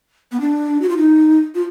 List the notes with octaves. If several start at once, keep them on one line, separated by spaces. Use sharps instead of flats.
B3
D4
F#4
F4
D#4
F4